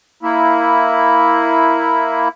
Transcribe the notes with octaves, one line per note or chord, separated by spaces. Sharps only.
A#3 E4